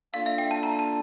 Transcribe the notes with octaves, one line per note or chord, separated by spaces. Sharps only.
A#3 D4 F4 A4 D5 F5
E5
G5
A5
A#5
A5